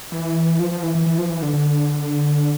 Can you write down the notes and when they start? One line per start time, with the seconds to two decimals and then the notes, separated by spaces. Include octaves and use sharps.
0.12 E3
0.60 F3
0.71 F3
0.83 E3
0.95 E3
1.07 E3
1.18 F3
1.30 E3
1.42 D3
1.54 D3